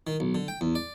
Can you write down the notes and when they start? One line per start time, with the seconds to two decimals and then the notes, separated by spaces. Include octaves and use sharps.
0.07 D#3
0.20 B1
0.35 D3
0.48 G5
0.61 E2
0.75 D5